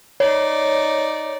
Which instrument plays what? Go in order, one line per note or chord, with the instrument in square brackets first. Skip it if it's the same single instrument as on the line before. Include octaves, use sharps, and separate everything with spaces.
[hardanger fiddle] D#4 D5 [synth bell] C#5